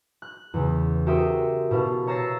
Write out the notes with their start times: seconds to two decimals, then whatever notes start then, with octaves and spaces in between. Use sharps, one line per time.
0.22 F#6
0.54 E2 C#3
1.06 F#4 G4 A#4 C5 E5 D#6
1.71 B2 E4 F5 A5
2.07 C#5 A#5 E6 A6 A#6 C7